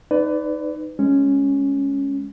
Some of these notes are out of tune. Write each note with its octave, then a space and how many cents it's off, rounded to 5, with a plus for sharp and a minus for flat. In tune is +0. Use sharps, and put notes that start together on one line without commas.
D#4 +0 B4 +25 D5 -15
G#3 +0 C#4 +0